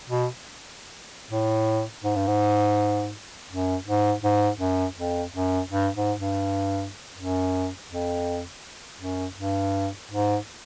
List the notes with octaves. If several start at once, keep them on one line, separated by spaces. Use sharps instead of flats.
B2
A2
G#2
G2
G#2
F#2
G#2
G#2
F#2
F2
F#2
G2
G#2
G2
F#2
F2
F#2
G2
G#2